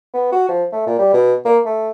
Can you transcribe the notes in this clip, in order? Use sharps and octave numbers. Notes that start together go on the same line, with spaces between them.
B3
F#4
F3
A3
A#2
G3
B2
A#3
A3